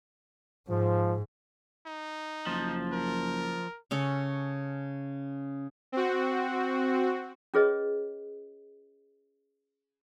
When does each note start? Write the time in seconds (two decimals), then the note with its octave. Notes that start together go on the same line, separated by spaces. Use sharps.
0.69 G#2 F3
1.86 D#4
2.47 F#1 F3
2.92 A#4
3.91 C#3 C#4 A4
5.92 C4 F#4
7.54 C#4 F4 G#4 B4 C#5 D#5